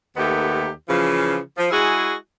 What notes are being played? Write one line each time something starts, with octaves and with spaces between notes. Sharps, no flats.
D#2 D#3 A3 B3 G4
C#3 E3 F3
F3
G#3 E4 F#4 G#4